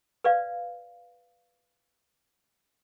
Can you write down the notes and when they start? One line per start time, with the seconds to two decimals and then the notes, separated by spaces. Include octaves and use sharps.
0.24 B4 D5 F5